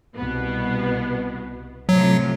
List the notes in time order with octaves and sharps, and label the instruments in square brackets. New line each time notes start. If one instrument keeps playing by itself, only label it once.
[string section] C2 B2 B3
[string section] A2 C3 F3 [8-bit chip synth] F#3